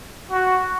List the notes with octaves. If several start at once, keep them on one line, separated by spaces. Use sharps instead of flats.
F#4